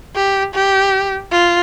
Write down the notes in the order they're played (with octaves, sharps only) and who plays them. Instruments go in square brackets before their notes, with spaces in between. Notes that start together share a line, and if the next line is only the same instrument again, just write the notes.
[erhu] G4
G4
F4